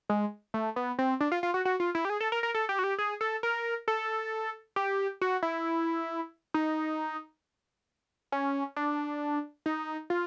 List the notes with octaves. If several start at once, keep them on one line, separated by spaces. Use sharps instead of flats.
G#3
A3
B3
C4
D4
F4
F4
F#4
F#4
F4
E4
G4
G#4
A4
A#4
A#4
A4
G4
F#4
G4
G#4
A4
A#4
A4
G4
F#4
E4
D#4
C#4
D4
D#4
F4